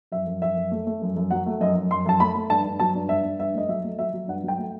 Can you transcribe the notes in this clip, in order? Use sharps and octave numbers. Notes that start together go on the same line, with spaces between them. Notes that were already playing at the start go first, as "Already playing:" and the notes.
F#2 E5
F#2
F#2 E5
F#2
A3
A3
F#2
F#2
F#3 F#5
A3
F#2 D#5
F#2
F#2 C6
F#2 A5
A3 B5
A3
G2 A5
G2
F#3 A5
G2
G2 E5
G2
G2 E5
A3 D#5
F#3 E5
A3
F#3 E5
F#3
G2 F#5
F#3 G5
A3